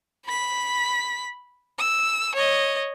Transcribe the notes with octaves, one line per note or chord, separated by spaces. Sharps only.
B5 B6
E6
C#5 D#5